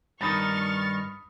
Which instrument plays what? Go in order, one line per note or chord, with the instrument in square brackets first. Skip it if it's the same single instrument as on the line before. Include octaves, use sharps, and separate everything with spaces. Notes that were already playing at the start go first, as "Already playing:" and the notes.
[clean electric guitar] G2 D#3 D#4 [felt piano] B5 D#6 [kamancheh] C#6 F6 [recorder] A6